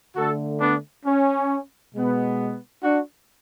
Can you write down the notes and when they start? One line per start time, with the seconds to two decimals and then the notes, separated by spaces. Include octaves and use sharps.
0.15 D3 A3 F#4 A4
0.60 B3 D4
1.06 C#4
1.94 B2 G#3 B3
2.84 D4 F#4